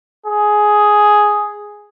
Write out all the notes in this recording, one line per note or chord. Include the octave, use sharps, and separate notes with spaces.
G#4